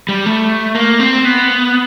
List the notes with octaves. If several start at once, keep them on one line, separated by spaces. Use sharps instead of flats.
G3
A3
A#3
C4
B3